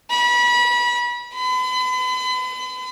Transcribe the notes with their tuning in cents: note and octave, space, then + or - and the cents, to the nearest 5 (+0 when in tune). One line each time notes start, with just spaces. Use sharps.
B5 -30
B5 +40